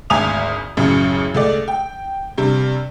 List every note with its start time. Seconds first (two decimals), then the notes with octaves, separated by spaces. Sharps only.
0.10 G#1 D2 G#5 A#5 D#6 F7
0.77 A1 F#2 C#3
1.34 C#2 A3 D5
1.68 G5
2.38 G2 C3